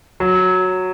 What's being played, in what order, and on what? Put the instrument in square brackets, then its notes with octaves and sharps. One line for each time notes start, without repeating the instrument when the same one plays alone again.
[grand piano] F#3